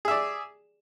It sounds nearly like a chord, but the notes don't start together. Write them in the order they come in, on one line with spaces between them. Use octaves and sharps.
G#4 E5 D5